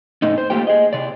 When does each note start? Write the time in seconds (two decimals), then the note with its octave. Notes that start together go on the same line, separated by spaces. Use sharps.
0.22 G#2 C3 A3 D#4
0.38 C5
0.50 A3 A#3 F4 G4 G5
0.67 G#4 D#5
0.93 C3 D5